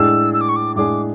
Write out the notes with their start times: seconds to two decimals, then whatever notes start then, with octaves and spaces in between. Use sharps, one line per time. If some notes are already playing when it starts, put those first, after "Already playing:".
Already playing: A2 G#3 D4 G#4 E6
0.34 E6
0.41 D6
0.49 C#6
0.56 D6
0.76 A2 G#3 D4 G#4 D6